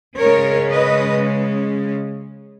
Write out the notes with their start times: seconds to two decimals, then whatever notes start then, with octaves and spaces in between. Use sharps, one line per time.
0.17 C#3 G#3 C#4 A#4 C#5
0.72 B4 D#5